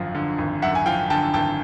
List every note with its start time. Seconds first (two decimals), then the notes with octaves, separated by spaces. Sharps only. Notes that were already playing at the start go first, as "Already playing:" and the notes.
Already playing: G#1 F#2 D3 F3
0.15 D3
0.38 G#1
0.62 F#2 E5 F#5
0.75 G#5
0.86 F3 F5 G5
1.10 D3 G5 A5
1.33 G#1 G5 A5